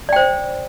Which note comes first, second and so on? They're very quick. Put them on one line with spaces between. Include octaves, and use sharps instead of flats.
D5 G5 C5